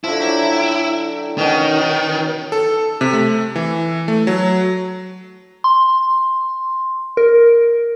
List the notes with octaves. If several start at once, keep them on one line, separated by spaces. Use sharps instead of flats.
D3 F3 E4
F#3 G5
B2 D#3 C#4 F#4
A4
C3
A3
E3
A3
F#3
C6
A#4